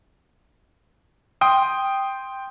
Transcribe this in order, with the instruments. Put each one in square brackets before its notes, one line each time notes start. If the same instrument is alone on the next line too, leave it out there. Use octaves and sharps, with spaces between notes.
[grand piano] G5 C6 D#6